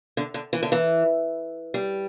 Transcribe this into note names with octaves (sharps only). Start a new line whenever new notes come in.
D3
D3
E3
D3
E3
G3